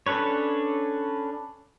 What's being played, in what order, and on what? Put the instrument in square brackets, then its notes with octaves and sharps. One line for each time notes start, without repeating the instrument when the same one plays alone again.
[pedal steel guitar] C#4 D4 A4 B4 C#5